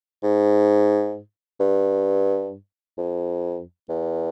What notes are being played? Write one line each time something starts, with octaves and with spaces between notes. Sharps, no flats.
G#2
G2
F2
E2